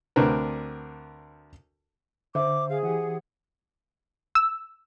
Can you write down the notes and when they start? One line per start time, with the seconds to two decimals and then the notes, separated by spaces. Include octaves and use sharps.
0.16 D2 C4 D4 A#4 B4
2.35 D3 C5 E5 D6
2.69 G#4 F5
2.83 E3 G4 F#5
4.35 E6